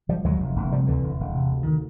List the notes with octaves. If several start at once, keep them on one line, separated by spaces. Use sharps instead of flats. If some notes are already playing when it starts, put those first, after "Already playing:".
D3 F3 G3
D#2 F#3 G#3
F1
F1
C3 F3 G3
D2 D3 E3
E1
E1
C3
D2
D#3